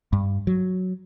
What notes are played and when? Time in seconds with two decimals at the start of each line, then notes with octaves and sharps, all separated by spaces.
0.13 G2
0.47 F#3